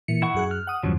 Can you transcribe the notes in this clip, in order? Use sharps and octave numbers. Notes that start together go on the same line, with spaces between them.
A#2 E3 C#7
E4 F#5 C#6
F#2 G#4 F#6
F6
F#5 D#6
E2 G2 C#3 F3 F#3